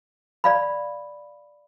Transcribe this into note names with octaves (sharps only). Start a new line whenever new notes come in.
D5 F5 B5